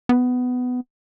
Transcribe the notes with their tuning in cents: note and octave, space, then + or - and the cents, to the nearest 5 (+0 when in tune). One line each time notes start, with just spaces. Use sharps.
B3 +15